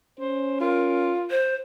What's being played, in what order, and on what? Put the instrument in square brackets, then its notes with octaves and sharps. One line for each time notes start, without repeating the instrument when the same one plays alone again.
[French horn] C#4 [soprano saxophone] C5
[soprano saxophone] F4 [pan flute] A#4
[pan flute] C5